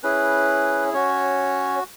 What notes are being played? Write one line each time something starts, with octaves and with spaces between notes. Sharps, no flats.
C#4 E4 G#4 B4
C#4 F#4 C#5